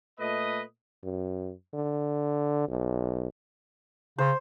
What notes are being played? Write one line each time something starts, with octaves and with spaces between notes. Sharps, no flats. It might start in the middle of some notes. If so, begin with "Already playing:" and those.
A#2 A3 B4 D#5
F#2
D3
B1
C#3 C5